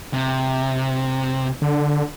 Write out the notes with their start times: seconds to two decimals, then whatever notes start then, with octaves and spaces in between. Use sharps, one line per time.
0.14 C3
1.62 D3